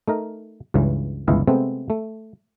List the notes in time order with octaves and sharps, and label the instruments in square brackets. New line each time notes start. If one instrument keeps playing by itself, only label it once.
[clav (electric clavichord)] A3 D#4 A#4
C#2 G2 C#3 E3
G1 C#2 E3 E4 D#5 F5
C3 G#3 A3 B3 C4
A3